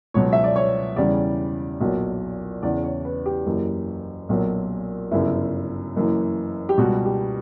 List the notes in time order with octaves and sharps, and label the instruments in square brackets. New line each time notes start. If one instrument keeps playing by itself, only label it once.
[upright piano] C#2 B2 F#3 C#5
E5
D5
C#5
E2 C#3 E3 G3 D5
B1 A#2 F#3
E2 C#3 E3 D5
C#5
B4
G4
F#1 F#2 E3
B1 A#2 F#3
G1 F#2 C#3 E4
F#1 F#2 E3
G4
C#2 B2 G3 F#4
G4